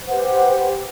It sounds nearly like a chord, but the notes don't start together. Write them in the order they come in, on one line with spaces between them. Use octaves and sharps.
C5 F#5 B4 G4